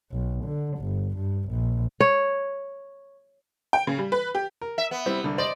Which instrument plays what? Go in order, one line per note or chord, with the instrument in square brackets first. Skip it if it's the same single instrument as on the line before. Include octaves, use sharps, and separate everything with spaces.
[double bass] B1
D3
G1
G2
A#1
[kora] C#5
[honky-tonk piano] G5
C#3
G3
B4
G4
[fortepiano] A#4
[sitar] E5
B3
[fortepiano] G3 C4 E4
C2 D3
[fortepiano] C5 D#5 [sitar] D5